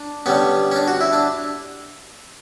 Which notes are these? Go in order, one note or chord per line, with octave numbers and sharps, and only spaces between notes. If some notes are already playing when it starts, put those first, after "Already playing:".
Already playing: D4
D3 G3 B3 C#4
C#4
D4
F#4
E4
D4